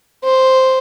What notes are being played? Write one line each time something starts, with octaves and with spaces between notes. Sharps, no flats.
C5